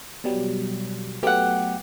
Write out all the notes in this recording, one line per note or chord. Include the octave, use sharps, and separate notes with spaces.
B2 F#3 G3
F#3 A3 B3 G4 F#5